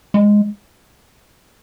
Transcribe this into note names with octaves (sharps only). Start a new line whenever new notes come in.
G#3